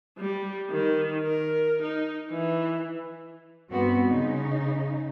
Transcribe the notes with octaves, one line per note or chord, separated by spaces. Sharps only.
G3
D#3
A#4
D#4
E3
G2 G3 B3 C4 F#4
C#3 D#4